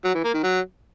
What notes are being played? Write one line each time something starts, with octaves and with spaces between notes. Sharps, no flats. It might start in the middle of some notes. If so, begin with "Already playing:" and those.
F#3
E3
A#3
D#3
F#3